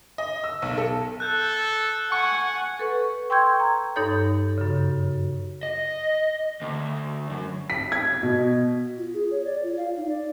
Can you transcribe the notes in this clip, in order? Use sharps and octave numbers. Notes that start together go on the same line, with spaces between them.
D#5
E6
B1
A4
A4 F#6 G6
F#5 G#5 C#6
A4 B4 C#6
G5 C6 C#6 E6 G6 G#6
A#5
G2 D#4 A4 C#5 G6
F#2 C#3
D#5
D2
F#2
B6
G#6
B2
F4
G#4
C#5
D5
F4
F5
D#4
D5